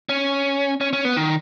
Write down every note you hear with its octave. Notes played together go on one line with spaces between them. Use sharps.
C#4
C#4
C#4
B3
D#3